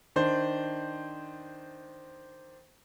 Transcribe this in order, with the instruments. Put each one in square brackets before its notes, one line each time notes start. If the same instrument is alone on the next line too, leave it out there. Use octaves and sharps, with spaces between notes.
[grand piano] D#3 D4 C5